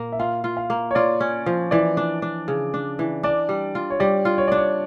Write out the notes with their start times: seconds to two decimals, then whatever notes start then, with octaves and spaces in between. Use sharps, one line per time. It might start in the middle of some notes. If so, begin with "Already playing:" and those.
Already playing: A#2 A#3
0.12 E5
0.20 F4 F5
0.44 F4
0.57 F5
0.70 A#3
0.91 C#5
0.95 F4 D5
1.21 C#4
1.46 F3
1.71 E3 D5
1.97 D4
2.22 D4
2.48 C#3
2.74 D4
2.99 E3
3.23 D4 D5
3.49 G3
3.75 F4
3.90 C#5
4.00 G3 D5
4.25 F4
4.38 C#5
4.48 D4 D5
4.57 C#5